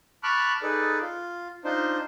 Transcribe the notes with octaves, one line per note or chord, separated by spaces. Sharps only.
A5 B5 C#6 D6 F6 F#6
D#4 G#4 A4 B4 D5
F4
D4 D#4 F4 C5